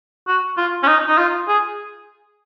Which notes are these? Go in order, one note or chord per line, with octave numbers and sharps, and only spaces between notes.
F#4
F4
C#4
D#4
D#4
F4
G#4